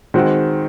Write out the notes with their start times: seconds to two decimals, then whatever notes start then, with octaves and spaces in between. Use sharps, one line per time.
0.14 D#3 G#3 C4 F#4